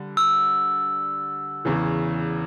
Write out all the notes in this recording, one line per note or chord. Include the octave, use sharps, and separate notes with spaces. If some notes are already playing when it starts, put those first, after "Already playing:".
Already playing: D3 G3
E6
E2 C#3 E3